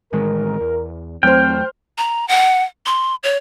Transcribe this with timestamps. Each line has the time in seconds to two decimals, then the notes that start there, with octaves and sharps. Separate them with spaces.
0.13 A1 D#3 G#3 A#4
0.60 E2
1.23 E2 F#3 A3 C4 C5 G5 F6
1.98 A#5
2.28 F#5
2.86 C6
3.23 C#5